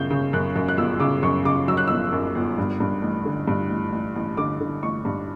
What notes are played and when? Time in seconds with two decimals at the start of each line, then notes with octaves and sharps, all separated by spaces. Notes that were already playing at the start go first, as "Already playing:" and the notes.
Already playing: G1 F#2 C#3 G6
0.10 C#3
0.33 F#2 F#6
0.56 F#2
0.68 F#6
0.77 G1 E6
1.00 C#3 D6
1.23 F#2 C#6
1.45 C#3 D6
1.68 F#3 E6
1.77 F#6
1.88 G1 E6
2.12 F#2
2.35 G1
2.58 G2
2.80 G2
3.02 A1
3.25 D3
3.48 G2
3.70 A1
3.93 A1
4.16 A1
4.37 D3 D6
4.60 D3
4.83 A1 C#6
5.05 G2